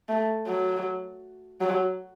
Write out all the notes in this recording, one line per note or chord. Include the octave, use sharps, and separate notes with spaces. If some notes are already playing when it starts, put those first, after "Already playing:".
A3
F#3
F#3